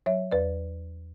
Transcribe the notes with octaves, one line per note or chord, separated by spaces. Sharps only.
F#3 C#5 E5
E2 B4 D5